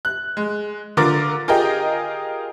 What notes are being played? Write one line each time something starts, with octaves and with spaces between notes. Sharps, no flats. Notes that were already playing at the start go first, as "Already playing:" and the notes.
F#6
G#3
D3 F4 A#4 D6 A6
F4 G4 G#4 A#4 D#5 G5